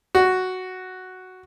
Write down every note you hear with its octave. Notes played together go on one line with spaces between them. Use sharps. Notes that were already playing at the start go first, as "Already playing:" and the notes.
F#4